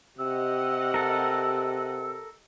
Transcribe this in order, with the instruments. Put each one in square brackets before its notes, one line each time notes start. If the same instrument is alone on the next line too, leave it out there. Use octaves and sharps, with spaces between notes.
[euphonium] C3 [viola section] G4 D#5 F#5 [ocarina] E6
[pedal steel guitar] A4 A#4